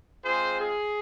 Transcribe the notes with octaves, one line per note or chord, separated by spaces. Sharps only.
G#3 C4 F4 G#4 C5
G#4